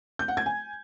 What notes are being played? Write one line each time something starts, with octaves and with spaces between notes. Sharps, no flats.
G6
F#5
G#6
G#5